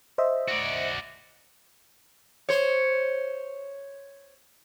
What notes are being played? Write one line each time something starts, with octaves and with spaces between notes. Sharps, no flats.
C5 D#5 E5
F#4 D5
C5 C#5